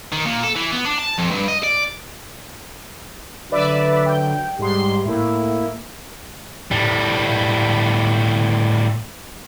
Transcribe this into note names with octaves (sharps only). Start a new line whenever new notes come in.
D#3
A#2
A4
E3
B3
D4
A5
F2
G2
D#5
D5
D3 F#3 B4 D5 E5
G5
G#2 G3 C6
A2 A#3 E4
A2 G3